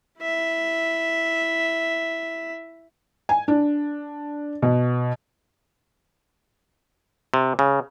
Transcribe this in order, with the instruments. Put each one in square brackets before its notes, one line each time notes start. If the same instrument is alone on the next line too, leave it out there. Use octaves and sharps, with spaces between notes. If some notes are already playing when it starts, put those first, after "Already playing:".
[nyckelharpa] E4 E5
[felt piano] G#5
D4
B2
[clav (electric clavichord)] C3
C#3